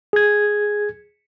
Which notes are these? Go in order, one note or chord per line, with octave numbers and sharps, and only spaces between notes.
G#4 G#6